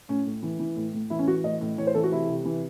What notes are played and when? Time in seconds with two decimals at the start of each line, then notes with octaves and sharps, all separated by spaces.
0.09 A2 C#4
0.26 A2
0.43 E3
0.59 E3
0.76 A2
0.93 A2
1.10 E3 E4
1.19 C#4
1.27 E3 F#4
1.44 A2 D#5
1.61 A2
1.78 E3 C#5
1.87 C5
1.95 E3 A4
2.04 F#4
2.11 C3 E4
2.29 C3
2.45 E3